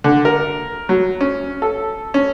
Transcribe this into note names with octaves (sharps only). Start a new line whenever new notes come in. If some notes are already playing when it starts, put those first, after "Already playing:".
D3
A#4
F#3
C#4
A4
C#4